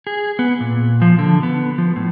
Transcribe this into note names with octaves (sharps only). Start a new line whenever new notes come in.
G#4
B3
A#2
F3
D3
B3
F3
A2